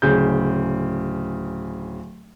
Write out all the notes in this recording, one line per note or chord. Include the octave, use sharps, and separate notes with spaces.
D1 C#3 G6